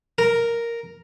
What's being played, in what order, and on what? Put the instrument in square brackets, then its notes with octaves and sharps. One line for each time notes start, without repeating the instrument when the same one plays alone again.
[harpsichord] A#4